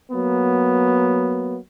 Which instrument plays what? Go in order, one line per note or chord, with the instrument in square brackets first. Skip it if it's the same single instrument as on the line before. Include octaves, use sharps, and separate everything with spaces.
[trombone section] F#3 A#3 B3